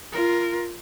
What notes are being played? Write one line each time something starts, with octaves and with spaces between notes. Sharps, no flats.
F4 A#4